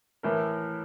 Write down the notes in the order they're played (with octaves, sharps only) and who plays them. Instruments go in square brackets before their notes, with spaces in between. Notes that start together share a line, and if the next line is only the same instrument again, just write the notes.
[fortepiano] A2 E3 A#4